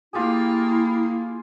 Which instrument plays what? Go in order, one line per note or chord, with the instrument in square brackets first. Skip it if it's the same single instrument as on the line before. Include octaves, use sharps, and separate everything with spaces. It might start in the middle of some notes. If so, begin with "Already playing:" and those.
[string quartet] A#3 [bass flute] E4 [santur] F4 G4 G#4